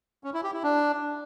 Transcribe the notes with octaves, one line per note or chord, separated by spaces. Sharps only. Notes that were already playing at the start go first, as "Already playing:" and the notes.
C#4
E4
G4
E4
D4